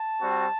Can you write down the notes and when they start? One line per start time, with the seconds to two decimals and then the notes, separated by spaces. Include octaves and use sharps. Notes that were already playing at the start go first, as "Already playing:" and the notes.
Already playing: A5
0.21 G3 C4 F#4